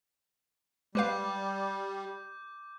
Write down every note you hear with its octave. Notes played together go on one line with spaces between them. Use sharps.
G3 G#3 B4 F5 D6 G6